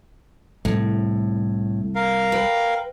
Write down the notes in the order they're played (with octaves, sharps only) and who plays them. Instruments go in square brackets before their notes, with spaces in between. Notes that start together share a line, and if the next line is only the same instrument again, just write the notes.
[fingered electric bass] C2 [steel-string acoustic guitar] A2
[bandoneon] A#4 F5
[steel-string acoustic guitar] B4 G5